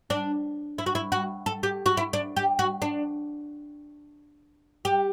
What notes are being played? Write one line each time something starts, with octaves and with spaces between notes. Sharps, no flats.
D4
E4
F#4
E4
F#4
A4
G4
F#4
E4
D4
G4
F#4
D4
G4